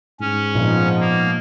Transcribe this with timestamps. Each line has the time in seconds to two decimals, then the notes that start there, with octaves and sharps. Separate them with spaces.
0.20 G#2 C#4
0.55 A#2 F3 B3 D#4
1.00 A#3